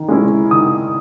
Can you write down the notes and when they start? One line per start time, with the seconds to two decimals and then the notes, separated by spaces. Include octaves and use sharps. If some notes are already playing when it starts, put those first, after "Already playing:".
Already playing: D#3
0.08 G#3 C#4 E4
0.51 D#3 D#6